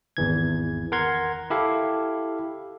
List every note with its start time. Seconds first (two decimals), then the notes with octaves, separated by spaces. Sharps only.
0.17 G#1 E2 E3 G#6
0.92 A#4 F#5 A#5 C6 G#6
1.50 E4 G4 A4 F5